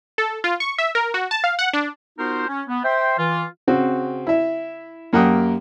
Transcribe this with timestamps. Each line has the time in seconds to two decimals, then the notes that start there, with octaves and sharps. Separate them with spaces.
0.18 A4
0.44 F4
0.60 C#6
0.78 E5
0.95 A#4
1.14 F#4
1.31 A5
1.44 F5
1.59 F#5
1.73 D4
2.19 B3 D#4 F4 F#4 A#4 C5
2.48 C#4
2.68 B3
2.84 C5 E5 G5 C6
3.18 E3 F4
3.68 C#3 C4 F#4
4.27 E4 E5
5.13 F#2 A#3 G4 F#5 G5 D#6